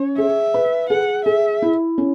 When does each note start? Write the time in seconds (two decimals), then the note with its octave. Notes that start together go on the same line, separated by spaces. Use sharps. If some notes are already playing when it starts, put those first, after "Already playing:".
Already playing: C#4 C#5
0.18 G#4 E5
0.54 B4
0.90 G#4 F#5
1.26 G#4 E5
1.62 E4
1.98 C#4